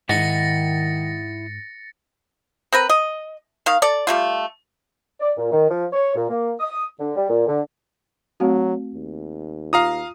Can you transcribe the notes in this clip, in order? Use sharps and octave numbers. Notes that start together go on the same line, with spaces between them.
G#2 D#3 E4 D#5 F#5 A6 A#6 C#7
C4 A#4 B4
D#5
D#3 F5
A4 D5
G3 A3 F4
D5
A#2
D#3
F3
C#5
A#2
A#3
D#6
D3
G3
A#2
D3
F#3 A3 C4 F#4
D#2
F4 F5 A#5 D#6